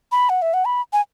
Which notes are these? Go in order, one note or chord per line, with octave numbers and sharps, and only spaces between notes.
B5
F#5
E5
F#5
B5
G#5